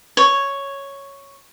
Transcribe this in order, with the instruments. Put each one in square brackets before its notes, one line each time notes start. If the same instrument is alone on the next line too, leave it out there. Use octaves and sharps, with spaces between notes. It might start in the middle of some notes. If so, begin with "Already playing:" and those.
[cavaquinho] C#5